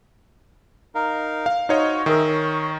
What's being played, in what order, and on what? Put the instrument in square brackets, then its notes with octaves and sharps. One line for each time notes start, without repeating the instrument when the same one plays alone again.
[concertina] D#4 A#4 F5
[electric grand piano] F5
[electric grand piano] D#4 C#5 D#5 [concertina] F#4 C5 F5
[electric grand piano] D#3 A#4 [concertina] G#4 E5
[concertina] C#5